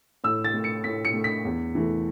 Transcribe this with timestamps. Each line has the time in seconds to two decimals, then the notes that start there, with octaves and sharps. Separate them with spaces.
0.24 A2 E6
0.44 A6
0.54 A3
0.64 C#7
0.84 A2 B6
1.05 C#7
1.14 A3
1.24 B6
1.45 E2
1.75 E3 A3